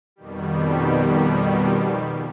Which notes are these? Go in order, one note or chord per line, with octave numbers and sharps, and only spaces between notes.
F2 B2 D#3 G3